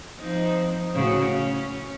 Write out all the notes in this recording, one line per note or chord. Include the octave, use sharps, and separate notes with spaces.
F3 C4 D#4
A2 C#3 F#4
C#4